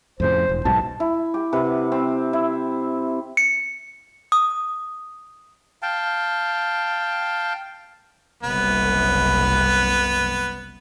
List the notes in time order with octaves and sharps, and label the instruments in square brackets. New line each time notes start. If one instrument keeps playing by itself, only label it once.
[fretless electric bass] F2 A2 C#3 [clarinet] C5
[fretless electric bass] E1
[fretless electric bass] B1 G#2 B2 [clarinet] A5
[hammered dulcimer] E4
G4
C3 B4 F#5
C4
E4
[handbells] C#7
D#6
[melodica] F5 G5 A5
[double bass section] F#1 C2 [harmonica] B3